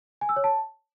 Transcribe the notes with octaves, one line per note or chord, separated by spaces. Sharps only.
G#5
E6
C#5
A5